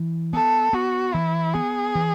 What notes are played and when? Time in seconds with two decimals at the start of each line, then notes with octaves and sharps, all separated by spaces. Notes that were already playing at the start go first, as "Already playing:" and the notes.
Already playing: E3
0.33 B3 A4
0.73 B3 F#4
1.14 E3 E4
1.54 B3 G#4
1.95 E3